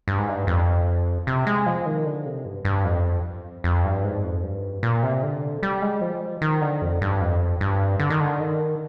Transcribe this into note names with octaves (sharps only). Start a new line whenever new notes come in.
G2
G#2
G2
F2
C3
G#3
F3
D#3
D3
C3
G2
G2
F2
F2
G2
G#2
F2
G2
A#2
C3
D3
G3
G#3
F3
D#3
D3
F2
G2
F2
G2
D3
D#3
D3
D#3